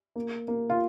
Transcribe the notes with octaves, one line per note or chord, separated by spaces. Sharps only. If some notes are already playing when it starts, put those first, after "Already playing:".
A#3
A#3
F4